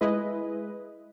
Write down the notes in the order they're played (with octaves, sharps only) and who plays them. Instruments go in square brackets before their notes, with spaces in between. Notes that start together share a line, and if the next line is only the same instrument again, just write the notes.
[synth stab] G#3 E4 G#4 B4 D#5